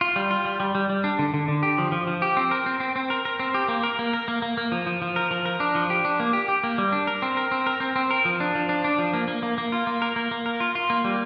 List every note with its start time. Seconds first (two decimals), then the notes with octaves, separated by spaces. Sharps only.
0.01 F4
0.16 G3
0.31 F4
0.45 G3
0.60 G3
0.75 G3
0.90 G3
1.04 D4
1.19 D3
1.34 D3
1.48 D3
1.63 G4
1.78 F3
1.92 F3
2.07 F3
2.22 G4
2.37 C4
2.51 A#4
2.66 C4
2.80 C4
2.96 C4
3.10 A#4
3.25 A#4
3.40 C4
3.54 G4
3.68 A#3
3.83 A#4
3.99 A#3
4.13 A#4
4.28 A#3
4.42 A#3
4.57 A#3
4.72 F3
4.87 F3
5.02 F3
5.16 A#4
5.31 F3
5.46 A#4
5.60 D4
5.75 F3
5.90 G4
6.05 D4
6.20 A#3
6.33 G4
6.48 G4
6.64 A#3
6.78 G3
6.92 D4
7.07 A#4
7.22 C4
7.37 A#4
7.51 C4
7.67 A#4
7.80 C4
7.96 C4
8.11 A#4
8.25 F3
8.40 D4
8.55 F3
8.69 D4
8.84 D4
8.98 F3
9.14 A#3
9.28 A#3
9.43 A#3
9.58 A#3
9.72 F4
9.87 A#3
10.02 A#4
10.16 A#3
10.31 A#3
10.46 A#4
10.60 F4
10.75 F4
10.90 A#3
11.04 G3